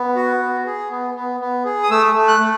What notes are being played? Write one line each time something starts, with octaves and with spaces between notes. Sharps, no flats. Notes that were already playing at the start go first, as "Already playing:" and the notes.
Already playing: B3
F#4
B3
G#4
B3
B3
B3
G#4
D#6
A3 E6
A3
F#6
A3